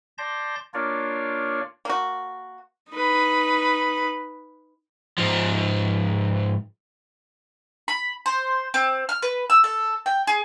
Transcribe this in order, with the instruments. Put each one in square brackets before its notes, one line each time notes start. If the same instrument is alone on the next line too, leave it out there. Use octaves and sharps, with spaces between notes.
[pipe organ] D5 A5 C6 G6 A#6
A#3 D4 F4 A#4 C#5 D5
[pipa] A#3 F#4
[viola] D#4 B4
[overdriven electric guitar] G#2 F3
[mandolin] B5
C5
C4
F6
B4
E6
A4
G5
G#4